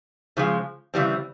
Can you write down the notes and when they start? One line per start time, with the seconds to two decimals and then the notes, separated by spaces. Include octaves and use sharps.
0.37 C#3 F3 G#3
0.94 C#3 E3 G3 C4